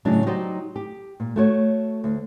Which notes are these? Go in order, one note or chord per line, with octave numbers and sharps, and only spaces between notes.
A2 C#3 F#3 D4 D#4
F#3 D#4 F#4 G4 C5 D5
G4
A#2
A3 F#4 C#5
D2